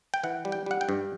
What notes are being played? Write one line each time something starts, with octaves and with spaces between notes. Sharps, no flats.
G5
E3 F#5
G3
G5
G3 F#5
G5
G2